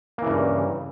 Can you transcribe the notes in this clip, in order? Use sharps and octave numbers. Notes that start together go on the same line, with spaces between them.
G2 C#3 E3 A#3